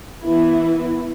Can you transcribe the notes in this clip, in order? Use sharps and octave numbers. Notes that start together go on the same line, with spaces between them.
E3 B3 E4